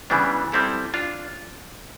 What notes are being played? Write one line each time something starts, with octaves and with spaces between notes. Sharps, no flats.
C#3 E3 G3 B3 D4
G3 C4 E4 A4
D4 F4